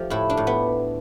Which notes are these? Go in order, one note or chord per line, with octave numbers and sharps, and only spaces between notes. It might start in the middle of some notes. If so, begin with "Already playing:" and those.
Already playing: F3 A3 G4 D5
A2 E4
D4
A2
B3